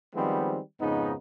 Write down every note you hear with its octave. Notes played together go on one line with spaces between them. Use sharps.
D#3 F3 G3 G#3 B3 C4
F2 G#2 C#3 B3 D#4